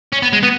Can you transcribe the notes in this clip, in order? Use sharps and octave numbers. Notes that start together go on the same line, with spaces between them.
C#4
B3
G#3
B3